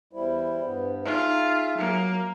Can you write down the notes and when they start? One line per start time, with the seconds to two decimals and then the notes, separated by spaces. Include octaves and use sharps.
0.13 E2 G3 E4 C5
0.63 G2 B3
1.05 D#4 F4 G#4 E5
1.78 F#3 A#3